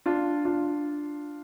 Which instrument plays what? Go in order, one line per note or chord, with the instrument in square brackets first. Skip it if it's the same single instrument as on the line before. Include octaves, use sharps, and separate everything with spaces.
[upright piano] D4 F4
D4 F4